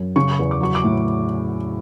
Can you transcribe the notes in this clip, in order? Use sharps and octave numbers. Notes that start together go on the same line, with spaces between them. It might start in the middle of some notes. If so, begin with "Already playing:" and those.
Already playing: F#2
C#3 C#6
E2
D6
F#3 C#6
D6
A2